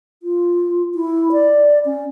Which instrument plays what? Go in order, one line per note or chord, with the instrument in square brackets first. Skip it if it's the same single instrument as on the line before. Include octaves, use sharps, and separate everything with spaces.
[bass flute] F4
E4
D5
C#4